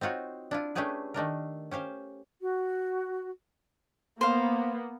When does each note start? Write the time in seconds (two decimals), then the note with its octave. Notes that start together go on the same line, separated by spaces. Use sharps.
0.01 C4 D#4 F4 F#4 C#5
0.51 D4 E4 F4
0.75 A3 C#4 D4 G4 G#4 B4
1.14 D#3 A3 D4 A#4
1.71 C#4 G4 C5 F5
2.41 F#4
4.21 A#3 B3 C5 F5